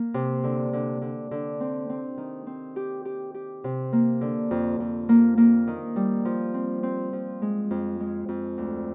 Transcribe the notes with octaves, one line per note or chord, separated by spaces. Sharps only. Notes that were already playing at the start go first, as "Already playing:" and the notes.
Already playing: A#3
C3
D3
D3
D3
D3
C4
C4
D#3
C4
G4
G4
G4
C3
A#3
D3
F2
F2
A#3
A#3
D#3
G3
F3
C4
C4
F3
G#3
F2
G#3
F2
D2